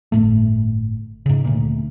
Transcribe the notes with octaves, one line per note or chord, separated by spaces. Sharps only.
G1 A2 A3
G#2 C#3
D2 A#2